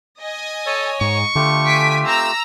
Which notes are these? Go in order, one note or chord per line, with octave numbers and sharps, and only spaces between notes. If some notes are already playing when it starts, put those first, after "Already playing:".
D#5 G#5
A4 C#5
G#2 C#6
D3 A3 F4 G4
G#5 B6 D7
C4 A#5 E6